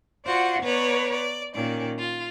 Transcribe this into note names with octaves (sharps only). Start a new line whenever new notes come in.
F4 F#4 C5 D5 F#5
B3 B4 C#5 D5 A#5
D5
A#2 D#3 C#4 D5
F4